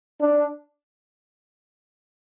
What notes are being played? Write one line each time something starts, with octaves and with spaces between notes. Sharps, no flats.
D4